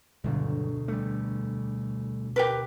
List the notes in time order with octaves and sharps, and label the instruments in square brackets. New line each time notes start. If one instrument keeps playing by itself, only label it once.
[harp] E1 D2 B2 [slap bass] G2 D3 F#3
[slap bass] G3 A3
[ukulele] G4 A#4 B4